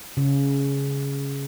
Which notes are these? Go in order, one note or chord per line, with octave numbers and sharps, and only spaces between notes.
C#3